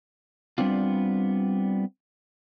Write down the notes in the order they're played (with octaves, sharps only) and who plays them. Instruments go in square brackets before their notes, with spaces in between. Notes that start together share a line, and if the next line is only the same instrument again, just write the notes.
[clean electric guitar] G3 B3 C4 D4 F4